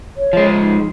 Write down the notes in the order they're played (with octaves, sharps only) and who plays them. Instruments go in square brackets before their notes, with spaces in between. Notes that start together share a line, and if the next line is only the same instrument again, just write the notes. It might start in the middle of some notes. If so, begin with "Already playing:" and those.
[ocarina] C#5
[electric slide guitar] F3 G#3
[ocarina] D#4